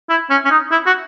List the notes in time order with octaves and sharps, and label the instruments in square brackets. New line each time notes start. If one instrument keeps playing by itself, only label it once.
[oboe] E4
C#4
C#4
D#4
E4
F#4